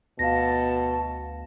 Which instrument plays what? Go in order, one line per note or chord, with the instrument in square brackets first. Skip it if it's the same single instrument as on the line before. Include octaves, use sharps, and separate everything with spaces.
[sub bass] D2 [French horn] B2 [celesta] F5 A#6 [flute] A5